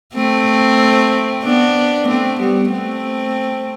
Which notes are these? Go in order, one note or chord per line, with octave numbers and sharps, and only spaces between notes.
A3 C4
B3 D4
A3 C4
G3 B3
A3 C4